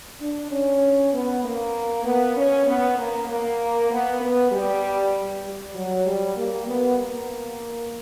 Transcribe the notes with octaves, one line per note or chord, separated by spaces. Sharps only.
D4
C#4
B3
A#3
B3
C#4
B3
A#3
A#3
B3
B3
G3
G3
F#3
G3
A#3
B3
A#3